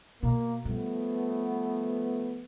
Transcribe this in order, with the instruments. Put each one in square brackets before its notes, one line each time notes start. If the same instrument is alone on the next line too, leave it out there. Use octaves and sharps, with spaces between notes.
[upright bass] B2 [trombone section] A#3
[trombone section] F3 A3 B3 [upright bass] G3